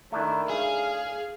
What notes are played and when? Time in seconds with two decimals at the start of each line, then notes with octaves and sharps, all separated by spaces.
0.12 D#3 A3 D4 E4
0.49 G#4 F5